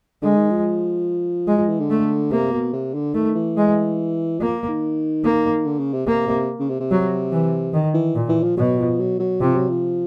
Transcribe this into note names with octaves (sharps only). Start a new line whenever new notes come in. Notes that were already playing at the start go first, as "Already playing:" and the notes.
D3 G#3
D#3
F3
G#3
F3
E3
D3
A3
C3 A#3
B2
C3
D3
D#3 A3
E3
G#3
F3 A#3
D#3
A#3
D3
C#3
C3
C3 A#3
C3
C#3
C3
C3
F#3
E3
D#3
E3
A#2
E3
F3
B2 F#3
F3
F#3
F#3
C3 F3
F#3
F3